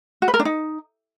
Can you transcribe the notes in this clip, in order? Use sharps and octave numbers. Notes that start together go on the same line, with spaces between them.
F#4
B4
A#4
D4
D#4